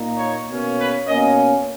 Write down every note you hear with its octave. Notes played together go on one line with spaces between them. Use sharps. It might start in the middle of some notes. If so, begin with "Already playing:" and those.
Already playing: A#2 A#3 D#4
C#5
B2 A#3 C#4
B4
B2 A#3 C#4 D#5